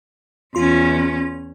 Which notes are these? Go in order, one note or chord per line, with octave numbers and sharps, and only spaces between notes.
E2 C#4 F4 C6